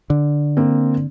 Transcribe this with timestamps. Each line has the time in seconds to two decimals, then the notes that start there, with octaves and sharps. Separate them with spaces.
0.10 D3
0.57 A#3 C4